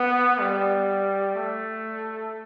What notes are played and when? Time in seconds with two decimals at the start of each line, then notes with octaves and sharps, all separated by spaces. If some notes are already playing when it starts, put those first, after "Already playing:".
Already playing: B3
0.40 G3
1.36 A3